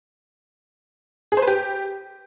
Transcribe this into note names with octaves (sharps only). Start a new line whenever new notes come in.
G#4
C5
B4
G4